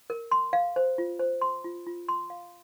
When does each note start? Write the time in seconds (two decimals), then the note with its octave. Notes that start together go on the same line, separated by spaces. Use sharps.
0.10 A#4
0.31 C6
0.53 F5
0.76 C5
0.98 F4
1.19 C5
1.41 C6
1.64 F4
1.86 F4
2.08 C6
2.30 F5